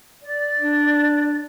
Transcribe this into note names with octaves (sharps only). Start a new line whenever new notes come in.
D5
D4